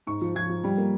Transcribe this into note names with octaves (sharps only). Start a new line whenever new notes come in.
G#2 C#6
F3
F3 G#6
F3
G3
A#3